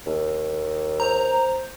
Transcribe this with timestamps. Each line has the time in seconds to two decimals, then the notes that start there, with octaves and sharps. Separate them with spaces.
0.06 D#2
1.00 C5 A#5